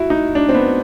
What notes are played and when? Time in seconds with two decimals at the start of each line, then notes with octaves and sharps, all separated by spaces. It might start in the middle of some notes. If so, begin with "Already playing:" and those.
Already playing: E4 F#4
0.10 D#4
0.35 D4
0.49 C4
0.55 B3